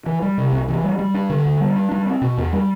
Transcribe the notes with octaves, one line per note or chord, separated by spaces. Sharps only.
E3
G3
C3
C2
E3
G3
G3
D4
D3
D2
G3
D4
G3
C4
B2
E2
G3